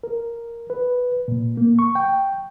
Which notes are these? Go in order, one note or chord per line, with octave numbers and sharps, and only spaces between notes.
A#4
B4
A#2
A#3
C#6
G5